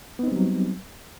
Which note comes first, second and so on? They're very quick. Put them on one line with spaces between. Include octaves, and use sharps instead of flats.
B3 D#4 C4 G3 F#3